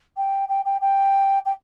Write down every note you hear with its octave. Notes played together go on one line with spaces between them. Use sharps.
G5
G5
G5
G5
G5